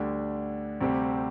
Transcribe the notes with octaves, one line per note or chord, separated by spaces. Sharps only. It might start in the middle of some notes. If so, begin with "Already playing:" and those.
Already playing: D2 D3 G3 D4
D2 C3 G3 C4 G4